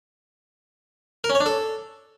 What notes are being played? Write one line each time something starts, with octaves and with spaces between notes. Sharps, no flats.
A#4
C#4
C#5
D4
A4